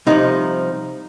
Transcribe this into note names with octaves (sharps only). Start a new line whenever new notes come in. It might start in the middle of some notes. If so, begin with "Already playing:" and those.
C2 C3 F3 D#4